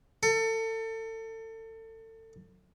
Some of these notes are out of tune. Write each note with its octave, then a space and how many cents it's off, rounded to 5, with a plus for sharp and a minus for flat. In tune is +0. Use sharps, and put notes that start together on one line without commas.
A4 +30